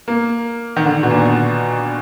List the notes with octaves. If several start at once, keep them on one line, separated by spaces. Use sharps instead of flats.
A#3
D#3
D3
B2
A#2